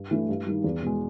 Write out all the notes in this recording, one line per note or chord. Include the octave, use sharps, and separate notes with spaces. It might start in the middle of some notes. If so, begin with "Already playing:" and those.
Already playing: G2
E3 A3 D4
G2
D#3 G3
E2
B2 G#3